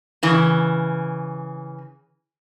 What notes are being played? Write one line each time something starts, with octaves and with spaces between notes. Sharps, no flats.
C#3 E3